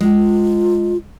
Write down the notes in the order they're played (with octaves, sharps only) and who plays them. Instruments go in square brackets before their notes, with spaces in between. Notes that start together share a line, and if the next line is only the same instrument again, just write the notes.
[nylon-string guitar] G#3 [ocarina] F4